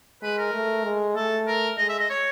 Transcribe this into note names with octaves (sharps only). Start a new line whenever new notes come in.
G#3 B4
A#4
A3
G#3
A3 A4
A#4
G#3 D#5
E5
D#5
C#5